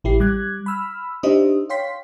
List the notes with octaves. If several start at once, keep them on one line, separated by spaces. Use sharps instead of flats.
A1 E4 G4 C7
G3 D6 F#6 G#6
B5 E6 F6
D4 D#4 G4 C5 D#5 E5
C#5 F5 G5 C6 B6